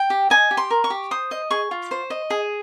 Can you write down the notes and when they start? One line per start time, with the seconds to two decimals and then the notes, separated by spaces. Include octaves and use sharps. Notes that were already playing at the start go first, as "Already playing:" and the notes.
Already playing: G5
0.10 G4
0.30 D#5 G#5
0.51 G4
0.57 C6
0.70 A#4
0.84 C#6
0.90 G4
1.11 C5 D#6
1.31 D#5
1.51 G#4 C#6
1.71 F4
1.91 C5
2.10 D#5
2.30 G#4